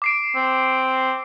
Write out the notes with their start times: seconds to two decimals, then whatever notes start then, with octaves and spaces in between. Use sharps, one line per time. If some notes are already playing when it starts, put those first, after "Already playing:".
0.02 D6 C7 D7
0.36 C4